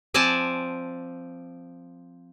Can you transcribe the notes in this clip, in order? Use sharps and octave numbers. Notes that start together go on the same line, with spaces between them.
F3 C4 D5 G#5 A5